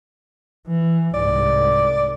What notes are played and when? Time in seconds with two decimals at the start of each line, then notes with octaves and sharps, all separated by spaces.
0.67 E3
1.14 C2 G#2 D5